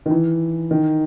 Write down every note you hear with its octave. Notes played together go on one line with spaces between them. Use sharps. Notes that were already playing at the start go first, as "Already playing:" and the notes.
D#3
E3
D#3